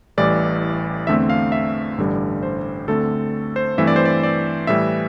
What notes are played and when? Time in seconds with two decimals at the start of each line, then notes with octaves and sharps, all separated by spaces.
0.18 A1 A2 E3 G3 D5
1.07 E2 D3 A3 C4 E5
1.30 F5
1.52 E5
1.98 A1 G2 D3 G3
2.43 C5
2.88 D2 D3 A3 C4 A4
3.56 C5
3.78 G2 E3 A3 C4 E5
3.87 D5
3.96 C5
4.05 D5
4.23 D5
4.67 A2 E3 G3 E5